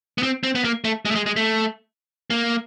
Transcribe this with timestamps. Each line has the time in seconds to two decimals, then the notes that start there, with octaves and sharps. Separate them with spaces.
0.18 B3
0.23 C4
0.43 C4
0.55 B3
0.64 A#3
0.84 A3
1.05 G#3
1.11 A3
1.15 G#3
1.26 G#3
1.36 A3
2.30 A#3